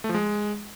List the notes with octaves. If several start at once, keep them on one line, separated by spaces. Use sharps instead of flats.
A3
F3
G#3